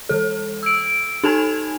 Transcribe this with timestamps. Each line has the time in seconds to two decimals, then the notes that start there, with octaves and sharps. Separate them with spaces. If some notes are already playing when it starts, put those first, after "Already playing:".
0.09 E3 A4
0.63 E6 D7
1.24 D#4 A4 G#5 A5 G#6